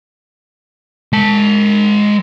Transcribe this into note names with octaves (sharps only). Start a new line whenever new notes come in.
G#3 A5